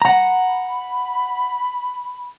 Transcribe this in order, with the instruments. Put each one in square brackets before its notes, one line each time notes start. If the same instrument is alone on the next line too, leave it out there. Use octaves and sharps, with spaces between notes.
[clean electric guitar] F#5 A#5 [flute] B5